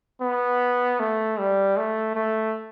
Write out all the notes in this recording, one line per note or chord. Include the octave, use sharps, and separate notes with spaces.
B3
A3
G3
A3
A3